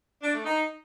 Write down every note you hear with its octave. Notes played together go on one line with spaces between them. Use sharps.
D4
A3
D#4